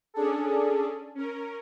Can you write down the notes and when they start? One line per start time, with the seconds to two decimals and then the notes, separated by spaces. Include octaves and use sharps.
0.14 C#4 D4 G#4 A4
1.15 C#4 A#4